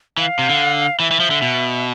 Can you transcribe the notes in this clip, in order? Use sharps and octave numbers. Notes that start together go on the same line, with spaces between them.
E3 F5
C3
D3
E3 E5
E3
F3
D3
B2